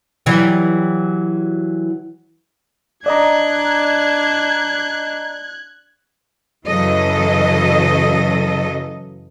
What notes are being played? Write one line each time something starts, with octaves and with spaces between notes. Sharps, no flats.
E3 F#3 G3
D4 D5 D#5 A#5 F#6 G#6
F#2 C#3 E3 F#3 A4 D#5